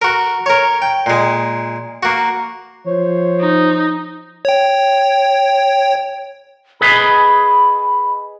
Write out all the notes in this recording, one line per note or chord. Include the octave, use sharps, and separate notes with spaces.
F#4 A#4
A#4 C#5
G5
A#2 G#3
A#3 F#4
F3 C5 C#5
D#4
C#5 G5
G#4 B4 D#5 B5